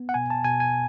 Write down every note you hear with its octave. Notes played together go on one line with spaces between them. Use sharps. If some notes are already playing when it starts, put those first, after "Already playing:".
Already playing: B3
F#5
B2 G#5
A5
B2 G#5
G#5